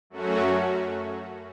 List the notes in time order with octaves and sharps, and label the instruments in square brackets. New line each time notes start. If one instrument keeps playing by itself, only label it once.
[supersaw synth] F#2 F#3 A3 C#4 F#4